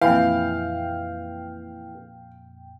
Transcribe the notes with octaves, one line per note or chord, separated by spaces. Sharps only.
F2 A#2 E3 F5 G5